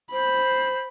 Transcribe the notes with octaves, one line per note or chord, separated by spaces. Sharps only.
C5 B5